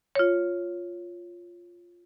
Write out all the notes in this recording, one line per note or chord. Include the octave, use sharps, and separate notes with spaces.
F4 C#5